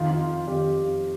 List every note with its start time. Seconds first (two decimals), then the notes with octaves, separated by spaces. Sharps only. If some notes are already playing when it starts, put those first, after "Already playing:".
Already playing: F2 D#3 F4
0.11 F4
0.47 F2 D#3 G4